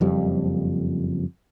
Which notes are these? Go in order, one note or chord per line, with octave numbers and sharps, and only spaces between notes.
F#1 F2 G3